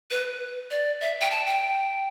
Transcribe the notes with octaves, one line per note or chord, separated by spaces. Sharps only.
B4
D5
E5
G5
A5
G5